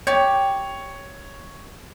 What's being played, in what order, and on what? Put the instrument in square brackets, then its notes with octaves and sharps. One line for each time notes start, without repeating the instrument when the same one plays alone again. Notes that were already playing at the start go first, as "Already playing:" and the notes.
[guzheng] G4 D5 [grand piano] C#5